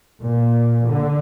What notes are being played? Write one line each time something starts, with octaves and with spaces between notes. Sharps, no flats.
A#2
D3